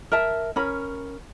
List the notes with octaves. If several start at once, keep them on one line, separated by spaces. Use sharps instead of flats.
A#4 E5 A5
C#4 A#4 B5